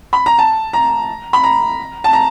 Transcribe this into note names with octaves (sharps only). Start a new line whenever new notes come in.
B5
A#5
A5
A#5
B5
A#5
A5
A#5